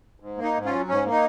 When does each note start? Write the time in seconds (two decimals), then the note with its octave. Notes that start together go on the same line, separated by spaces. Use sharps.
0.20 G#2
0.38 A#3 D#4
0.54 G#2
0.65 C#4 F4
0.71 F#3
0.88 G#2 C#4
1.05 A#3
1.10 D#4